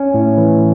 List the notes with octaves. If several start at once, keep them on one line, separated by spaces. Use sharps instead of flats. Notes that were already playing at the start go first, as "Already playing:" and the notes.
Already playing: C#4
A2
E3